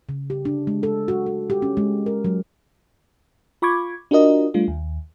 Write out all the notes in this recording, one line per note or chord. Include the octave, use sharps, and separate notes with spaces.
C#3
G4
D4
G#3
A4
F#4
A4
G4
C#4
G#3
A#4
F#3
F4 B5 C#6 D6 G#6
D4 F4 F#4 A#4 D#5
G3 A3 D4 F4
D#2